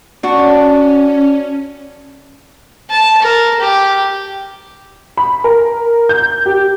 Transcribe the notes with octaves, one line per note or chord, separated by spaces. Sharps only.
C#4 D4 F#4
A5
A#4
G4
B5
A#4
G6
G4